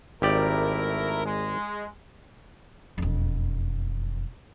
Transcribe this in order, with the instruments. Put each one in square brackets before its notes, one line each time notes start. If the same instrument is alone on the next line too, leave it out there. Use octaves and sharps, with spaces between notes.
[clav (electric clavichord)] G#1 G4 D5 [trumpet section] A3 E4 A#4
[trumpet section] G#3
[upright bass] E1 F2